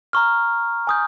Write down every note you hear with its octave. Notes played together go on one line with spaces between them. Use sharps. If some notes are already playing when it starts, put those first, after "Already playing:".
A#5 C#6 F6
G#5 D#6 G6